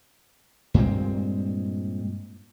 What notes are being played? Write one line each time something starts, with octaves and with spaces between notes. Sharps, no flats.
G2 A#2 G#3 C4